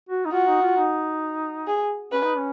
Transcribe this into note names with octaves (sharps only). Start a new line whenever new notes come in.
F#4
D#4
F4 F#4
D#4
F4
D#4
G#4
C#4 B4
D#4
C#4